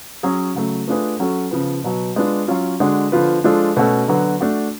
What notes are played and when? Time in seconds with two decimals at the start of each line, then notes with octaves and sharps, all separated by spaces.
0.23 F#3 C#4 G#4
0.55 C#3 F#3 A3
0.88 A3 D4 F4 G#4 B4
1.19 F#3 C#4 F#4 A4
1.51 C#3 F3 B3
1.84 B2 F#3 B3
2.16 G#3 B3 D4 F4
2.48 F#3 C#4 F4
2.80 D3 G#3 D4 F#4
3.12 D3 F3 B3 F4 B4
3.44 F3 G#3 D4 F4 A4
3.76 B2 A3 C#4 F#4 A4
4.08 D3 F#3 B3 F#4
4.41 A3 D4 F#4